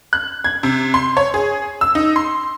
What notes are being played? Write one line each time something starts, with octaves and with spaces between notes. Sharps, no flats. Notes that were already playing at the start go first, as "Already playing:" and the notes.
F#6
G#6
C3
C6
C#5
G#4
E6
D#4
C6